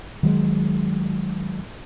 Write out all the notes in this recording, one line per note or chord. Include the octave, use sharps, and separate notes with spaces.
D#3 F#3 G#3